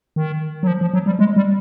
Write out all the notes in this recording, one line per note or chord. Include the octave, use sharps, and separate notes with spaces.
D#3
F#3
F3
F3
F#3
G3
G#3
G3